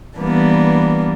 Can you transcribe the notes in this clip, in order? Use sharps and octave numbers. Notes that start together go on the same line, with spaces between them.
E3 G3 A#3 B3 D4